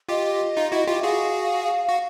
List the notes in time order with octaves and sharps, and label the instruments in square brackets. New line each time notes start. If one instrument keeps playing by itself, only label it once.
[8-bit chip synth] F4 G4 [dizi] D#5
[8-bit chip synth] D#4 F4
E4 F#4
F4 G4
[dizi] E5
[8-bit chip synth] F#4 G#4 [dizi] F5
[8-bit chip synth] F#4 [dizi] F5